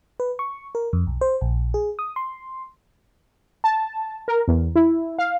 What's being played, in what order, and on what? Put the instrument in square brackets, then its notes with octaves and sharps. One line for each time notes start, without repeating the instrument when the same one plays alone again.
[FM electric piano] B4
C#6
A#4
F2
B1
C5
A#1
G#4
D#6
C6
[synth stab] A5
A#4
E2
E4
F5